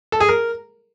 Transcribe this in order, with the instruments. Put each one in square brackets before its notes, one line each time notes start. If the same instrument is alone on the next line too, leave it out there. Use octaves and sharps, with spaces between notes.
[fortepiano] A4
G#4
A#4